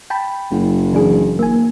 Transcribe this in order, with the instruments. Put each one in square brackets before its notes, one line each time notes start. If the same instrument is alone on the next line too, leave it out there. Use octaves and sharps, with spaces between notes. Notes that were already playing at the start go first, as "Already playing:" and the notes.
[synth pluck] G5 A5 B5
[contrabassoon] F#1
[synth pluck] E3 D4 G#4
A#3 G#5